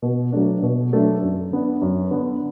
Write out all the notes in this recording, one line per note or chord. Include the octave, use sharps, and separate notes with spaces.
B2
F#3 A3 D4
B2
F#3 A3 D4
F#2
D3 B3 D4
F#2
D3 B3 D4